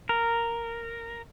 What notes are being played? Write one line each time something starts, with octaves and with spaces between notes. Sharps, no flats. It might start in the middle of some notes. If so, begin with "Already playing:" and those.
A#4